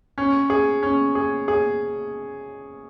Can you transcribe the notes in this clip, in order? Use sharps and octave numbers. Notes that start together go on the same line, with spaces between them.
C#4
G#4
C#4
G#4
G#4